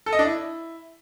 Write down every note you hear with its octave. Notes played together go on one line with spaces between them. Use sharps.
A4
D#5
D4
E4